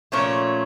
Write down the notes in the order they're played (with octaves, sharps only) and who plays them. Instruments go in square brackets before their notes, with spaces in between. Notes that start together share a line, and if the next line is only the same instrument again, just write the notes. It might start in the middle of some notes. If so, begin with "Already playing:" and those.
[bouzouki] A#2 F3 A3 C#4 C#5